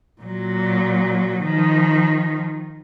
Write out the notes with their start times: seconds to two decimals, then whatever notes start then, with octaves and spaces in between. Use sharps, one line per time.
0.22 A#2 F#3
1.42 D#3 F3